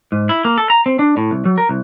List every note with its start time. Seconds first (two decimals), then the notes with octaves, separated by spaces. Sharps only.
0.12 G#2
0.29 E4
0.45 A#3
0.58 A4
0.70 A#5
0.86 C4
0.99 D4
1.17 A2
1.31 C2
1.45 F#3
1.58 A#4
1.69 C2